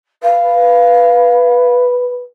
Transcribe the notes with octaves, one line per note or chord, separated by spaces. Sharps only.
B4 F5